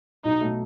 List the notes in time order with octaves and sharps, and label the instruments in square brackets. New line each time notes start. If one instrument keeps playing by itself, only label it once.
[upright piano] B1 [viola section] D#4
[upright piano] B2 F#3 A3